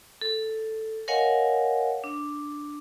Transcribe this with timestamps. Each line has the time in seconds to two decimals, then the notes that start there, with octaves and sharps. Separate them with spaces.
0.21 A4
1.08 A#4 C#5 D#5 F5 F#5 G#5
2.04 D4